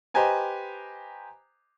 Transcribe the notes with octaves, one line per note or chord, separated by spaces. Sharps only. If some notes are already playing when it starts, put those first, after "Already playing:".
G4 B4 C5 D#5 G#5 A#5